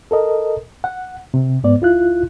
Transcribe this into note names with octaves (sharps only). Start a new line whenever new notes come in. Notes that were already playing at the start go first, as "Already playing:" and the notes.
A4 A#4 D#5
F#5
C3
G#2 B3 D5
D2 E4 F4 F#6